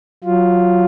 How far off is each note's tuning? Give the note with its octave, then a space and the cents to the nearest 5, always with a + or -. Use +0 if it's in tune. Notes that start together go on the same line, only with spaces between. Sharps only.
F#3 +0 F4 +0